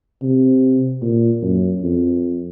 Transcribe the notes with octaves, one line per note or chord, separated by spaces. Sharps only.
C3
A#2
F#2
F2